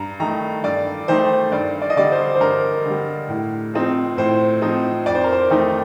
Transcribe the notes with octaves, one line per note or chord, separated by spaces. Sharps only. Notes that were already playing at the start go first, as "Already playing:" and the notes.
Already playing: G2 A#5
D#3 A3 D#4 A#5
G2 D5
D#3 A3 D#4 C5
G2 D5
D5
D#5
D3 G3 D5
C5
C5
G2 A#4
D3 G3
A2
F3 C4 D#4
A2 C5
F3 C4 D#4
F2 D5
C5
A#4
C5
D#3 A3 D#4